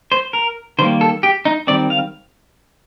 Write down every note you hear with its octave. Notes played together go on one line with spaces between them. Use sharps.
C5
A#4
D#3 G3 A#3 C5
A4
G4
D#4
D#3 G3 C4 D5
F5